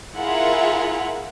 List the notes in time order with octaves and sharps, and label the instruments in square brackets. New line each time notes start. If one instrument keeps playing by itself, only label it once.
[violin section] E4 F4 G#4 A#4 E5 F#5